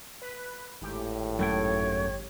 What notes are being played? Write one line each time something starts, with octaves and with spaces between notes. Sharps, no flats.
B4
G#1 A2 G4
F#2 A3 C#5 G5